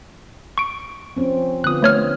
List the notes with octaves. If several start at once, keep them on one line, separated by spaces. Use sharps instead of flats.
C#6 D7
F3 C4 C#4
D3 B3 F4 D#6 F#6
A3 C#5 F6